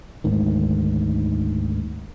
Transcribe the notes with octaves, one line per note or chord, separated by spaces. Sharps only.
D2 G#2 D#3